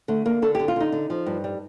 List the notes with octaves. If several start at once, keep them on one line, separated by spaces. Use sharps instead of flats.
D3 A3
D3 A#3
D3 A4
D3 G4
F4
D3 D#4
D3
F3
G2
G3